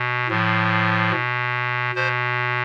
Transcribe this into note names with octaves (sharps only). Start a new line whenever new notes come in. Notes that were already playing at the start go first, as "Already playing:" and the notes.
Already playing: B2
A2 F3
B2
B2 C5